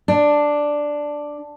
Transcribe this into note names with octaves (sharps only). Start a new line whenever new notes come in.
D4